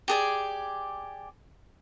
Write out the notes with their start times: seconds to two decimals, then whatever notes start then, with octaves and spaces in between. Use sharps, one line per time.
0.08 G4 G#4 D5